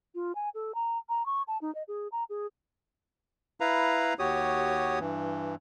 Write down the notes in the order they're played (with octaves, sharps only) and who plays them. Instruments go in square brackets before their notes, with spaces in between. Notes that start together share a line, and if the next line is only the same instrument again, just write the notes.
[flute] F4
G#5
A4
A#5
A#5
C#6
A5
D#4
D#5
G#4
A#5
G#4
[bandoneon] E4 B4 F5 A#5
D#2 F#4 G4 C#5 D#6
G2 E3